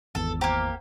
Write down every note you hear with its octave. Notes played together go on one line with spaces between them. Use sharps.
G#1 E2 A4
A#3 G4 C5 A#5